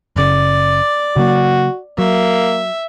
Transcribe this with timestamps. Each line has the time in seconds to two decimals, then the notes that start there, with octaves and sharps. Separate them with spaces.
0.16 F#1 C#3 D5
1.16 C#3 F#3 A#3 F#4
1.98 F#3 A#3 E5